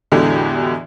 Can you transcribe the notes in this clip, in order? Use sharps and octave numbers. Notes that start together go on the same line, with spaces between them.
E2 A2 D3 G#3 F#4 G4